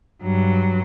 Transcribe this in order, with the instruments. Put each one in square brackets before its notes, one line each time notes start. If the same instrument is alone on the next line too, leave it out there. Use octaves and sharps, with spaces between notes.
[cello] G2 F#3